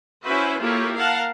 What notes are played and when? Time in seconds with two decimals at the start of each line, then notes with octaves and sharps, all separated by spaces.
0.24 C#4 E4 F#4 B4 C5 E5
0.59 A#3 E4 F4 G4 A4 C#5
0.94 A#4 F5 F#5 A5